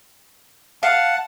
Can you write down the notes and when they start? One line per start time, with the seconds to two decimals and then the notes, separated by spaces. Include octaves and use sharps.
0.83 F5 F#5 A5